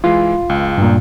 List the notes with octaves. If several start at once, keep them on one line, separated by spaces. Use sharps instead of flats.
E3 G#3 F4
C#2
G2 A#2